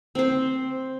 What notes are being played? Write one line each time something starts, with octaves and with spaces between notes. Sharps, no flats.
C4 C5